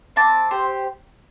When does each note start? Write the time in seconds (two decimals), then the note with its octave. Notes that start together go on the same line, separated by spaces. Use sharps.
0.16 C4 A5 D6
0.51 G4 C5